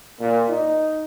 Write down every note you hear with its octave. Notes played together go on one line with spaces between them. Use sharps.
A#2
D#4